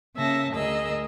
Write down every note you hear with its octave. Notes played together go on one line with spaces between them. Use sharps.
C#3 A#3 E5 A5 A#6
D2 G#4 A#4 D#5 E6